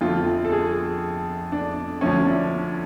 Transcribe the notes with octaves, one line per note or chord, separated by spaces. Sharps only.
F2 D3 F3 A3 F4
A4
G#4
D4
D2 D3 F3 A3 C#4
D4